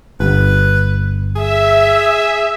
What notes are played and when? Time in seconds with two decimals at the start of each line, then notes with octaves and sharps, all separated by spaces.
0.20 G1 B4
1.36 G#4 E5